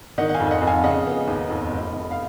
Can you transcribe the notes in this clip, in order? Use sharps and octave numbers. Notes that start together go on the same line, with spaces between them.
D#3 D#5 F#5
F#5
F5 G#5
F2
G#5
D#5 F#5
F2
F5 G#5
C#3 D#5 F#5
B3
D#2
F2
F1
F1
F5